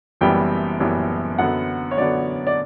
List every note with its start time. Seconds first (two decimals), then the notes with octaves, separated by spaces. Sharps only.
0.21 F#1 F#2 E3 G3 B3 G5
0.80 F#1 F#2 E3 G3 B3
1.38 F#2 D3 F#3 B3 F#5
1.91 C#5
1.97 F#2 D3 F#3 B3 D5
2.47 D5